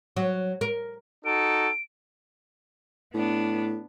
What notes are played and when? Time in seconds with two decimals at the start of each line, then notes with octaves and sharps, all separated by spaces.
0.17 F#3
0.61 A#4
1.25 D#4 F#4 A4 D7
3.14 A2 B3 D4